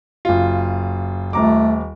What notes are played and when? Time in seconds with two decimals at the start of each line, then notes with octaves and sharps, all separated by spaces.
0.25 F#1 F4
1.33 D#1 A3 A#5 D6